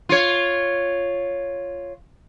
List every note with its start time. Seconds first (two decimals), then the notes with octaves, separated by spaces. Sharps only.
0.09 F4 C#5